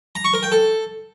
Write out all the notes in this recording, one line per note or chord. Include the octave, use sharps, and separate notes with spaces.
A#5
C#6
A#4
G5
A4